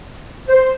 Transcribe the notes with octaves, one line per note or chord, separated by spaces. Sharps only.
C5